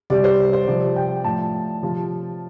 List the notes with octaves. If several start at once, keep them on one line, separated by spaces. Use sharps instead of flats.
C3 G3 D5
C5
C5
C3 F3 D5
G5
A2 F3 A5
C3 F3